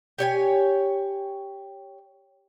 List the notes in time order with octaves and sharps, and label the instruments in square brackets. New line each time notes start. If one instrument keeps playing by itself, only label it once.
[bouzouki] G4 C#5 G#5